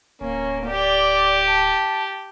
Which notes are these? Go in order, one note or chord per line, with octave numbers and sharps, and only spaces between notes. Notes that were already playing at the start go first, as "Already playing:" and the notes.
D1 A#3 C#4
G4 D5
A5